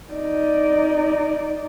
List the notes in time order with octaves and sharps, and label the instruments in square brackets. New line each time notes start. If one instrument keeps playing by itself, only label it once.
[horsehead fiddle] D#4 D5